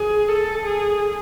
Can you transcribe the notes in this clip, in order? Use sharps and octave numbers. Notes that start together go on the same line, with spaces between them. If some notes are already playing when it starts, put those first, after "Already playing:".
Already playing: G#4
A4
G#4